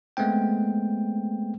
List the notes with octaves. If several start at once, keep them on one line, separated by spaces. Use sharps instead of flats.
G#3 A3 B3 C4 G5